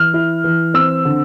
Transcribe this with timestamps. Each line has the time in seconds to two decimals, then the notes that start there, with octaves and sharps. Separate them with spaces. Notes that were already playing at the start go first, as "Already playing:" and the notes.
Already playing: E3 F6
0.14 E4
0.44 E3
0.74 C4 E6
1.05 D3